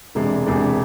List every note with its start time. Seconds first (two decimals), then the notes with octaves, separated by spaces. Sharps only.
0.15 E1 E2 C3 G#3 D4
0.46 E1 E2 C3 G#3 D4